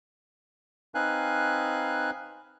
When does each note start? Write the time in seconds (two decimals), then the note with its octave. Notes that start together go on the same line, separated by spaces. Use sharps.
0.95 C4 D#4 B4 F5 G#5 F#6